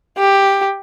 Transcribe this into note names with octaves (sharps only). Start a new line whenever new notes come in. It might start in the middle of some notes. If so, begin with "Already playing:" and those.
G4